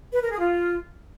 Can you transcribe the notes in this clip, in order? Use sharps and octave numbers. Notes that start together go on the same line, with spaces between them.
B4
A#4
G#4
F4